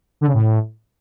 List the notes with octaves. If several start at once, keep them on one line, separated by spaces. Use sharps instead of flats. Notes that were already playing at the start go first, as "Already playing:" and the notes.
D3
C#3
A2